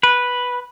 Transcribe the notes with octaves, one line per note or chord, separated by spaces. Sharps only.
B4